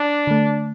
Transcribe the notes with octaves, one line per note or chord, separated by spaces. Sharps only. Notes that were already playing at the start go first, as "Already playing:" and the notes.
Already playing: D4
D3 A3